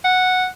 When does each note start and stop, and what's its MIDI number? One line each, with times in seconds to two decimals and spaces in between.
0.04 0.46 78